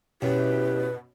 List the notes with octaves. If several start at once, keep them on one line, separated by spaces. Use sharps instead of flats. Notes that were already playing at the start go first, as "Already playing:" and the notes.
F#2 B2 E4 G4 B4